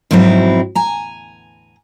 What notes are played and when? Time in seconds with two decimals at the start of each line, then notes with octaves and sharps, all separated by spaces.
0.11 F2 G#2 B2 F#3 C4 E4
0.75 G#5 A#5